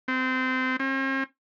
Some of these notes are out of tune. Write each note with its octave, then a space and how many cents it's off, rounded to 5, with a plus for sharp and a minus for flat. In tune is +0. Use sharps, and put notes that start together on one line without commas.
C4 -25
C4 +45